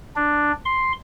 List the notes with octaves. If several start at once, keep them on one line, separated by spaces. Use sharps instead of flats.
D4
C6